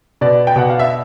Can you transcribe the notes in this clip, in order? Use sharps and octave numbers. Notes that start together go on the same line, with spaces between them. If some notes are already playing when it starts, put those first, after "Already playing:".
B2 D5
G5
B2 F#5
F5
E5